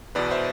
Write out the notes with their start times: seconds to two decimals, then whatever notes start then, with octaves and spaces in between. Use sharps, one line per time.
0.15 E2 B2 B4 D5
0.31 C5 E5